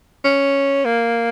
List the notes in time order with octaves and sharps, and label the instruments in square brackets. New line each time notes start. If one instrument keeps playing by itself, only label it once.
[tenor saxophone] C#4
A#3